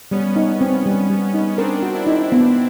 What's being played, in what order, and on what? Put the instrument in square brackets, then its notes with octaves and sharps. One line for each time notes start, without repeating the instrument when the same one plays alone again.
[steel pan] G3 [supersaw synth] B3 C#4
[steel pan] D#4
C4
G3
G3
D#4
[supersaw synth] C4 D4 [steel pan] A#4
[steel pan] F#4
[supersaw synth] D4 E4
[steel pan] D#4
B3